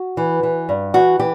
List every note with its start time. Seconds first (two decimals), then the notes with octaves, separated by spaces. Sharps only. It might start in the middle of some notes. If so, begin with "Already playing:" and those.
Already playing: F#4
0.17 E3
0.43 E3
0.69 G2
0.94 E3 F#4
1.19 E3 G4